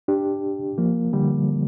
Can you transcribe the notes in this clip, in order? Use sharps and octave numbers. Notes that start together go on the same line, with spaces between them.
D4 G4
F3 A#3
D3 G3